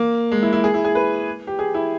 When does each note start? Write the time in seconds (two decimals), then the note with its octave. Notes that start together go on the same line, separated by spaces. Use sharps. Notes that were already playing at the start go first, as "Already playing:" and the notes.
Already playing: A#3
0.32 G#3
0.42 E4
0.53 E4
0.64 G#4
0.74 E4
0.85 G#4
0.95 B4
1.47 G4
1.59 G#4
1.74 E4